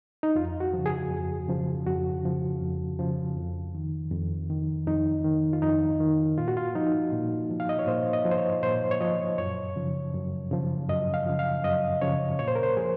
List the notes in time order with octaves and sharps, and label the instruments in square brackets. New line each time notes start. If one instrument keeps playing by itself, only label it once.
[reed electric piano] D#4
F2 F4
F#4
C#3 F3
G#4
F2
C#3 F3
F2 F#4
C#3 F3
F2
C#3 F3
F2
D#3
F2
D#3
F2 D#4
D#3
F4
F2 D#4
D#3
A#2 F4
F#4
F4
F3 D#4
A#2
F3
F5
D#5
C#5
A#2 C5
D#5
F3
C5
C#5
A#2 C5
C#5
F3 D#5
F#2 C#5
C#3 F3
F#2
C#3 F3
F#2 D#5
F5
C#3 F3
F5
F#2 D#5
C#3 F3 C#5
A#2 C#5
C5
A#4
C5
F3 G#4